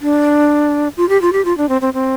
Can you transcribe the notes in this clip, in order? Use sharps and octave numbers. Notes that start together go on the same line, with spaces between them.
D4
F4
G4
F4
G4
F4
D4
C4
C4
C4